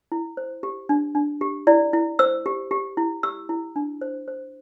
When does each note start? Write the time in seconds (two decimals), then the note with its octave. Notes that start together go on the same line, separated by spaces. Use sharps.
0.12 E4
0.37 C5
0.63 G4
0.89 D4
1.15 D4
1.41 G4
1.67 E4 D5
1.93 E4
2.19 C5 E6
2.46 G4
2.71 G4
2.97 E4
3.23 G4 E6
3.49 E4
3.76 D4
4.01 C5
4.28 C5